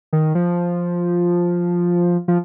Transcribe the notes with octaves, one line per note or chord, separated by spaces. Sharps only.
D#3
F3
F3